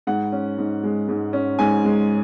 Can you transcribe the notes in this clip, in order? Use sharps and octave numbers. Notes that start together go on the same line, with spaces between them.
G#2 F#5
C#4
G#2
G#3
G#2
C#4
G#2 G#5
G#3